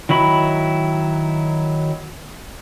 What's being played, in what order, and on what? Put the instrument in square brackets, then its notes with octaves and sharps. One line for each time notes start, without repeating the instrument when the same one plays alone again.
[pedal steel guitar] D#3 F#3 E4 B5